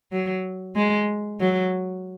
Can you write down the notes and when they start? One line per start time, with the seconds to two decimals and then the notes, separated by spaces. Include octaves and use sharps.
0.12 F#3
0.75 G#3
1.40 F#3